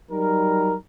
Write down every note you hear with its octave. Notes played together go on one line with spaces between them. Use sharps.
F#3 G3 D#4 A#4